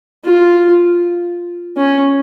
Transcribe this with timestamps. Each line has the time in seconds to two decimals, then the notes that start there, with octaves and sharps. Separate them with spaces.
0.24 F4
1.77 C#4